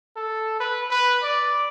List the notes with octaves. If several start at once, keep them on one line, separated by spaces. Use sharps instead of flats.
A4
B4
B4
D5